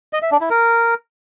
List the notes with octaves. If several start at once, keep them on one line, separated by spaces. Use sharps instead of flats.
D#5
E5
D4
E4
A#4